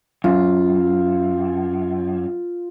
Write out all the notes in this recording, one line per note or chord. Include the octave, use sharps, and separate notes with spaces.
F#2 F4